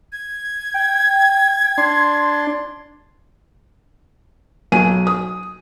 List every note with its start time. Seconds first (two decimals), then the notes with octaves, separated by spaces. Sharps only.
0.12 G#6
0.74 G5
1.78 D4 C6
4.72 B1 F#3 G#5 D#7
5.07 D#6